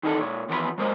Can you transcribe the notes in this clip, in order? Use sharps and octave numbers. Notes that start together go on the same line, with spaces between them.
D#3 E3 D#4 G4 A4
A#2 C#5
D#2 E3 F3 B3 A4 B5
F#3 G#3 A#3 C5 D5 D#5